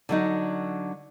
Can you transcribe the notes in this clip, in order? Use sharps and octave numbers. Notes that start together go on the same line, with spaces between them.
D3 F#3 D#4